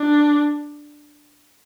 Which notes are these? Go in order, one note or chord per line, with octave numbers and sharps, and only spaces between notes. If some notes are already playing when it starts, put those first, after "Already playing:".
Already playing: D4